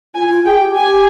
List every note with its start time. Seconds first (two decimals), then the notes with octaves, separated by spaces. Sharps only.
0.15 F4 G#5
0.30 F4
0.45 G#4 G5
0.60 G4
0.74 G4 G#5